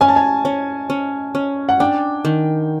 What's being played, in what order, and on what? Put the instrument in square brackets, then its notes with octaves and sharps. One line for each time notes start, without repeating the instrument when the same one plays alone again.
[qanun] C#4 [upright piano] G#5
[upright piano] A5
G#5
[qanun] C#4
C#4
C#4
[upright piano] F#5
[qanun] D4 [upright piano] G5
[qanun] D#3